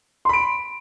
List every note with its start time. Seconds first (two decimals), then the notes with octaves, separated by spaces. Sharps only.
0.25 C6
0.29 B5
0.33 D7